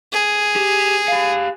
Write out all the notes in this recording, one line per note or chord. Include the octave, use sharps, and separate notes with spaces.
G#4
G4
G4 F5